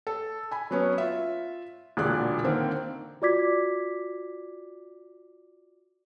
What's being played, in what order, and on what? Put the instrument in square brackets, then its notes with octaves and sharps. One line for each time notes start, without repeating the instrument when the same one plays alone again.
[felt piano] A4
G#5 B5
F#3 B3 C#4
F4 E5
E1 A#2 D3 G#4 D5 F#6
D3 D#3 A#3 C4
[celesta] F4 F#4 D5 D6 G#6 B6